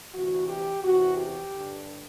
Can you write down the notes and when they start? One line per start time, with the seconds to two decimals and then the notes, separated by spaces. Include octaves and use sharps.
0.14 D2 C3 E3 F#4
0.49 G4
0.83 E2 C3 E3 F#4
1.17 G4
1.52 G2 D3